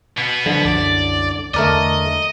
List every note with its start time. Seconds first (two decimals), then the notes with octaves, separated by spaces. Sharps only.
0.17 B2 B3
0.46 D3 E3 F3
0.65 C2 F#2 D5
1.54 E2 D3 A3 A#4 D5 D#5